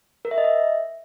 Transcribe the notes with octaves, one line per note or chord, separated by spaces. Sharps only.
A#4
E5
D#5
E5